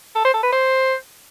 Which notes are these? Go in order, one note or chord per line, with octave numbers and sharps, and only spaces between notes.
A4
C5
A4
B4
C5